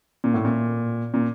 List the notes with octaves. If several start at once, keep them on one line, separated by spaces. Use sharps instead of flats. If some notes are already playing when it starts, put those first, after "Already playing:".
A#2
A2
A#2
A#2